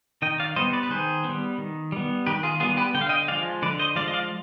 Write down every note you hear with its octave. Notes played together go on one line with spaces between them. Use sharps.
D#3 D#5 G5
D5 F5
G3 B3 C5 D#5
B4 D5
B4
D#3 G#4 C5
G3 B3
D#3
G3 B3
D#3 G4 B4
F4 G#4
G3 B3 F4 G#4
G4 B4
D3 G5
F5
D#5 G5
F3 G#3 D5 F5
D3 B4 D5
C5 D#5
F3 G#3 D5 F5
D#5
D5 F5